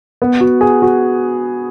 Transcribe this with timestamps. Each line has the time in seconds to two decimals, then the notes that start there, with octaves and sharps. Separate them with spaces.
0.22 B3
0.41 F#4
0.61 G#4
0.82 F#4